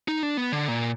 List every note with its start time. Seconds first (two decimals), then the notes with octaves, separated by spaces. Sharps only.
0.08 D#4
0.23 D4
0.37 B3
0.52 D3
0.68 A#2